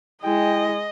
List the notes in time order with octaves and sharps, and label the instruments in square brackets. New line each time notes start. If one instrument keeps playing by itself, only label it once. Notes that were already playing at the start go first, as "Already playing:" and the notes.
[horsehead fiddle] G#3 [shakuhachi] E4 [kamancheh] D#5 [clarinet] G5